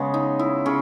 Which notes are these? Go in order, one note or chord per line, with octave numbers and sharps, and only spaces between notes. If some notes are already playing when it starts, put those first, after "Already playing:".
Already playing: C#3 G#3 B3 C#4
D#4
E4
C#3 C#4